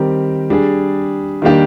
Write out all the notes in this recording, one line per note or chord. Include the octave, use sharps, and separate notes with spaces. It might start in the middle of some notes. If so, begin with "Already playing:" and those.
Already playing: D#3 G3 C4 G4 A#4
G3 D4 G#4
D#3 G3 A#3 D4 G4